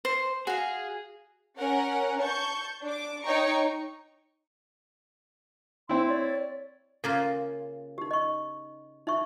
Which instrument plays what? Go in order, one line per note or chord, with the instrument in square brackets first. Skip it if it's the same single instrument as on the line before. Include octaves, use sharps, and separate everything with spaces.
[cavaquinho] C5
[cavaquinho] F#4 F5 [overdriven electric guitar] G#4
[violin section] C#4 A#4 F#5
A5 C#6 G6
D4 D6
D#4 C#5 G5 A#5 C#6
[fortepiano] C4 E4 [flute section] E5 C6
[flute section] C#5 D5
[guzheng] C#3 A#3 F4 [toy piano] A4
[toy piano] D#4 G4
D#5 C#6
D#4 E5 C#6